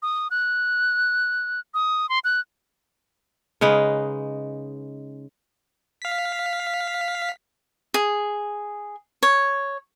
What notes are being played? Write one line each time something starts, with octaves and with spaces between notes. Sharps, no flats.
D#6
F#6
D#6
C6
F#6
C#3 G#3 D#4 B4
F5 B6
G#4
C#5